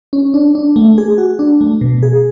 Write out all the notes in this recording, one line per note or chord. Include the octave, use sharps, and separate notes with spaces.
C#4
D4
D4
A3
G#4
F#4
D4
A3
B2
G#4